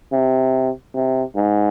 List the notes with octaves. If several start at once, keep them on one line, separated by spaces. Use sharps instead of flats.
C3
C3
G#2